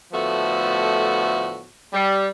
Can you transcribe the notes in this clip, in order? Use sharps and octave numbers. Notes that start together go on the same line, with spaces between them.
A2 D3 F3 A3 B3 F#4
G3